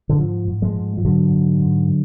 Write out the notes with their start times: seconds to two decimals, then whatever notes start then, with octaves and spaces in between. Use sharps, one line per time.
0.09 D3
0.19 G#2 F3
0.48 G#2
0.62 F3 G#3
0.76 G#2
0.97 F3
1.05 G#2 D3 F#3
1.33 G#2
1.61 G#2